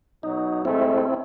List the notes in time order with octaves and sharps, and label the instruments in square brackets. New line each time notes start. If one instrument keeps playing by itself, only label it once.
[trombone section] B2 F#3 [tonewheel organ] D#4
[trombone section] C3 G#3 A3 [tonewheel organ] C4 E4